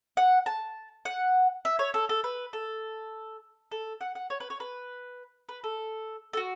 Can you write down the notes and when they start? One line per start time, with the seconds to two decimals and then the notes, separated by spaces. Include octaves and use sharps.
0.17 F#5
0.46 A5
1.05 F#5
1.65 E5
1.79 C#5
1.94 A4
2.09 A4
2.24 B4
2.53 A4
3.72 A4
4.01 F#5
4.15 F#5
4.30 C#5
4.40 B4
4.50 C#5
4.60 B4
5.49 B4
5.64 A4
6.33 A4
6.37 F#4